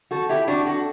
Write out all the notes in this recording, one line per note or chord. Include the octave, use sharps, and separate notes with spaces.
G3 F#4 A4
E4 G4
G3 D4 F#4
F#4 A4